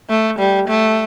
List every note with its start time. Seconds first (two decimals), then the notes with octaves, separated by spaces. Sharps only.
0.10 A3
0.39 G3
0.68 A3